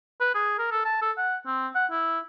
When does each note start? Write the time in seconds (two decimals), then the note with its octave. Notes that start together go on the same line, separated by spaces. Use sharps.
0.20 B4
0.35 G#4
0.58 A#4
0.71 A4
0.85 A5
1.02 A4
1.17 F#5
1.46 C4
1.75 F#5
1.91 E4